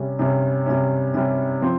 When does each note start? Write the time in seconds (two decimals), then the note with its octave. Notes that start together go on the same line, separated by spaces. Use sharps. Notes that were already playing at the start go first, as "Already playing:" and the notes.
Already playing: C3 G3 C#4
0.19 C3 G3 C#4
0.66 C3 G3 C#4
1.14 C3 G3 C#4
1.62 F3 C4